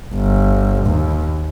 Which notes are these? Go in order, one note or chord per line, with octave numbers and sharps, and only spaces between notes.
G1
D#2